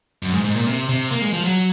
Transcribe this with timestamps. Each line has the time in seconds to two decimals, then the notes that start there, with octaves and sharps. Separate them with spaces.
0.23 F#2
0.33 G#2
0.44 G#2
0.56 A#2
0.66 C3
0.89 C3
1.11 A#3
1.22 G#3
1.33 F3
1.44 F#3